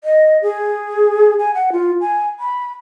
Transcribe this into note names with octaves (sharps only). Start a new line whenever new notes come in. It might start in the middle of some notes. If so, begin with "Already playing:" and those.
D#5
G#4
G#5
F#5
F4
G#5
B5